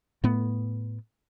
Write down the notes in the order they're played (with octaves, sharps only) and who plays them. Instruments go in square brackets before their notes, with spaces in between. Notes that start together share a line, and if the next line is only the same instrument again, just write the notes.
[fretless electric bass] A2 A3 B3